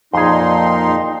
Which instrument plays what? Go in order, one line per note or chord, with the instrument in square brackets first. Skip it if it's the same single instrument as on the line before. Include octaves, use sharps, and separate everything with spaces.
[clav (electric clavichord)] F2 G#4 [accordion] A#2 D#4 C6